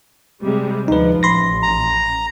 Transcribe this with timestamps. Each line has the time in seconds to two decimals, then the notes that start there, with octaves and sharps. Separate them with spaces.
0.43 C3 G3 G#3
0.88 D2 F3 D#4 B4
1.23 A1 B5 C6 A#6
1.63 A#5